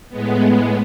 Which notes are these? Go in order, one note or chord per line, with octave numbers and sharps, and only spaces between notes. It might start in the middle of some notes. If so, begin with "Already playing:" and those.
A2 G#3 B3